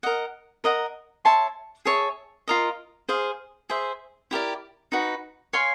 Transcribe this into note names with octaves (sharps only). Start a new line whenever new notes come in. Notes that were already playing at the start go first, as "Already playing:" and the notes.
A#4 D#5 F#5
A#4 D#5 F#5 A#5
C#5 E5 A5 C6
G#4 C#5 E5 A5
F4 A#4 D#5
G#4 C5 F5
G#4 C5 E5
E4 G4 A#4 D5
D#4 F#4 B4
C#5 F5 G#5 C6